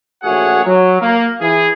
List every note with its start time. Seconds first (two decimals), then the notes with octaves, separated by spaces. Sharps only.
0.23 A#1 A3 F#4 G#4 C#5 F#5
0.64 F#3
1.00 A#3
1.39 E3 G#4